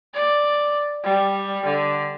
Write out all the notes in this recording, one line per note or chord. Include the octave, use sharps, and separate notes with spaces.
D5
G3
D3